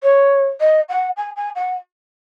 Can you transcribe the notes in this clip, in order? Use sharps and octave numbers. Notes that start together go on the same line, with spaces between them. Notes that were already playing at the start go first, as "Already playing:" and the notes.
C#5
D#5
F#5
G#5
G#5
F#5